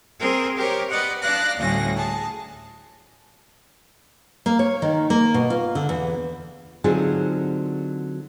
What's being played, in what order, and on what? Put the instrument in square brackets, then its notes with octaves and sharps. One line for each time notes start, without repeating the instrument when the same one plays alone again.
[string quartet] C4 G#4 A#4 C5
G4 A#4 C5 C#5
B4 D5 D#5 F#5
D4 D5 F5 F#6 A#6
D2 A2 G3 C#4 A#6
G#4 A5
[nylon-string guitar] A#3
C#5
D#3
A#3
B2
F4
D3
E2
D3 F#3 C4 D#4 F4 G#4